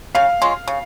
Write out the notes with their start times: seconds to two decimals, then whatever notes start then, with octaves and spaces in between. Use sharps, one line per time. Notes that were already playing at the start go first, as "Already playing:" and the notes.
0.15 C#3 F5
0.42 G#3 C#4 F4
0.68 C#3